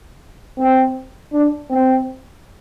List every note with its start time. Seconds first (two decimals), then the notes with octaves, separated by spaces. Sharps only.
0.58 C4
1.32 D4
1.70 C4